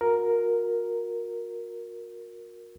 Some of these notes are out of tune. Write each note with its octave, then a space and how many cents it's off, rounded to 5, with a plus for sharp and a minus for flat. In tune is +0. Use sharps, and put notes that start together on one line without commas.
F#4 -40 A#4 +0